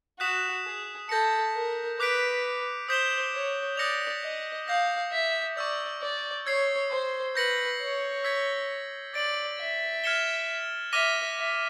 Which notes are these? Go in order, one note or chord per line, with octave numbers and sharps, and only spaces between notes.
F#4 D#6 F#6 B6 E7
G#4
A4 G6 A#6 C#7
A#4
B4 D6 F#6 B6 D7
C5 D#6 G6 B6 E7 G7
C#5
D5 D#6 F#6 A#6 C#7 F7
D#5
F5 D#6 G6 A#6
E5
D5 C#6 E6 G6
D5
C#5 E6 G#6 C7
C5
B4 G6 A#6 C#7 F#7
C#5
E6 G#6 B6
D5 A6 D7 F#7
E5
F6 G#6 C#7 E7 G7
E5 D6 F6 A#6 D#7 G7
E5